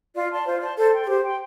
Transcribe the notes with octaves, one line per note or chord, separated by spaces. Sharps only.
F4 D5
D5 A5 C6
F4 C5
D5 A5 C6
A4 C5
G5 C6
A4
G4 C5
G5 C6